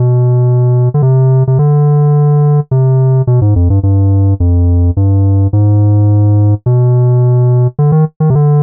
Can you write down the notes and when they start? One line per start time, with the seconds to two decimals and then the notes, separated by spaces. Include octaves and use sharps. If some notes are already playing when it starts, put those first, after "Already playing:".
Already playing: B2
0.94 D3
1.02 C3
1.47 C3
1.59 D3
2.71 C3
3.27 B2
3.41 G#2
3.56 F2
3.70 G2
3.83 G2
4.40 F2
4.97 G2
5.53 G#2
6.66 B2
7.79 D3
7.92 D#3
8.20 D#3
8.30 C3
8.35 D3